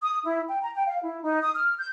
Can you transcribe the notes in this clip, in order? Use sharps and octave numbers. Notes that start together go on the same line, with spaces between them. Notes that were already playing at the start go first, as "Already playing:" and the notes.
D#6
E4
G5
A#5
G5
F5
E4
D#4
D#6
F6
G6